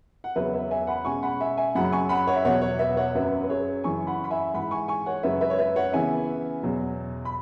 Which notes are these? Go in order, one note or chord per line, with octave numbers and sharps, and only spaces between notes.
F#5
E2 C#3 F#3 C#4 B4 E5
B4 E5
E5 G#5
F#5 B5
B2 G#3 C#4 G#5 C#6
F#5 B5
E5 G#5
E5 G#5
F#2 C#3 F#3 F#5 B5
G#5 C#6
F#5 B5
C#5 F#5
E5
E2 B2 F#3 C#5 F#5
C#5 F#5
B4 E5
C#5 F#5
F#2 F#3 C#4 B4 E5
B4
G#4 C#5
F#2 C#3 E3 G#5 C#6
F#5 B5
B5
E5 G#5
G#2 E3 G#3 F#5 B5
G#5 C#6
G#5 C#6
C#5 F#5
F#2 C#3 G#3 B4 E5
B4 E5
C#5
B4 E5
C#5 F#5
C#3 E3 B3 E5 G#5
E2 B2 F#3
B5